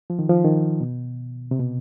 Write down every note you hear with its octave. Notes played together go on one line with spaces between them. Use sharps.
F3
D#3
F3
D#3
B2
C3
B2